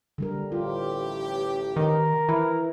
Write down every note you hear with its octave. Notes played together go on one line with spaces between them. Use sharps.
D3 G3 A#4
A1 F4 G4
D#3 A#4
E3